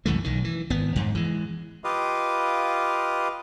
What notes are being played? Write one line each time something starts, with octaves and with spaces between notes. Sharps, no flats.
C2 F#2 E3 A3
B1 D#3
E3
G#1 B3
F2 G#2
E3 G#3
F4 G4 B4 D#5 F5